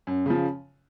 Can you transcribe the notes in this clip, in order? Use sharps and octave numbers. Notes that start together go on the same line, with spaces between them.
F#2
C#3 F3